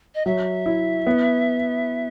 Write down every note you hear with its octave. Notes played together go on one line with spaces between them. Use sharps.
D#5
F#3 E5
E4
B3